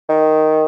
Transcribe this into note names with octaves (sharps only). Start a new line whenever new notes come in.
D#3